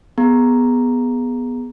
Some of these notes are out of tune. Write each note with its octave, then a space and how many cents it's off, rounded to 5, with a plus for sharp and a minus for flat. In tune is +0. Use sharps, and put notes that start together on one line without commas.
B3 +0 G#4 +0 A#5 +0